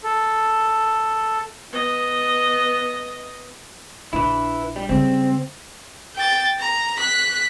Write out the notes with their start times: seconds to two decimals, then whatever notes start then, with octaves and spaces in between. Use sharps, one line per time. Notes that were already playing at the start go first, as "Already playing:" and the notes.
0.04 A4
1.72 B3 D#5
4.13 A#1 D4 E4 B4
4.76 G3
4.89 C#3 G3 C4
6.15 G5 A6
6.59 A#5
6.97 F#6 B6